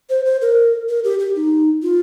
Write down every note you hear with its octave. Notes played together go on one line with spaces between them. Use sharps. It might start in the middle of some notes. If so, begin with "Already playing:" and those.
C5
C5
A#4
A#4
G4
G4
D#4
F4